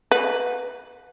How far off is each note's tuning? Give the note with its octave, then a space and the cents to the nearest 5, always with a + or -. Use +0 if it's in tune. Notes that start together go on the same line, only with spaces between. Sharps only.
B4 +0 F#5 -40